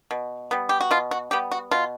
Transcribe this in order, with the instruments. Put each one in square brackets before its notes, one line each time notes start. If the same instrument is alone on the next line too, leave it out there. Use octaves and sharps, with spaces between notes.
[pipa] B2
G3 B3
G4
F#4
B2 F4
F#4
G3 B3 G4
F#4
B2 F4